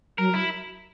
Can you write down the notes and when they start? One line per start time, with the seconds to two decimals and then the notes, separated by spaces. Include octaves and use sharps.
0.18 F#3 A#4
0.34 F#3 E4